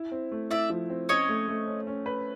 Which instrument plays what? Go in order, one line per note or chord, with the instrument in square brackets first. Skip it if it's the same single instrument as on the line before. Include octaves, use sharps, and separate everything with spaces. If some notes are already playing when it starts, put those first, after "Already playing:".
Already playing: [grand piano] E4
C4
A3
[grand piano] E4 [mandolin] D5 E5
[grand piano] F3
C4
[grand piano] C#4 [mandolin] C#5 D#5
[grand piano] A3
A3
C#4
C#4
B4